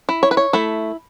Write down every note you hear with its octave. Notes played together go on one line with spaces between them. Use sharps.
E4
C#5
B4
C#5
A3 E4